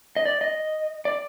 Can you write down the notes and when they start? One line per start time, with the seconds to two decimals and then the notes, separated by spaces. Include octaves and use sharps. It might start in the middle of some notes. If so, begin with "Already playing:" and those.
0.16 D#5
0.25 D5
0.41 D#5
1.05 D5